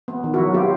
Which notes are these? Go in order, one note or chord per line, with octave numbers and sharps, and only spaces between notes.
B3
D#3
E4 F#4
F#3
B3 F4 G4